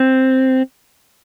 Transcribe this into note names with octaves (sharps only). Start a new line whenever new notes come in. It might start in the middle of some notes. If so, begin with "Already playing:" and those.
Already playing: C4